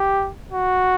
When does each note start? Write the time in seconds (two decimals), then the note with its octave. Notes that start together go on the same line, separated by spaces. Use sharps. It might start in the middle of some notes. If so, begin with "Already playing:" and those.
Already playing: G4
0.52 F#4